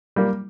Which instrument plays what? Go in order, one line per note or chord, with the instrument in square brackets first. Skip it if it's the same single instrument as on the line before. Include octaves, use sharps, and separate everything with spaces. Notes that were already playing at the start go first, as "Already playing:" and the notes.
[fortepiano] G3 A#3